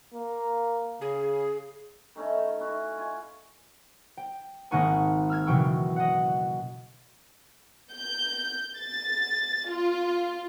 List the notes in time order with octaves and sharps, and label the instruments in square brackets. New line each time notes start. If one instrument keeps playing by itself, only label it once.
[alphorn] A#3
[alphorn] C#3 [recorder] G#4
[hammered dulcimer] D#3 A3 C#4 E4
E4 F#4 G#5
F4 G#5
[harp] G5
G#1 A#3 D#4 F#5 G#5 C#6
E6 F6 G#6
F#1 B2 E3 G5 C#6 E6
D#5 F#5
[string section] G6
A6
F4